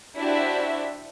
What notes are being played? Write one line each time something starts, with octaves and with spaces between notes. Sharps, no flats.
D4 E4 F#4 G4 C5 E5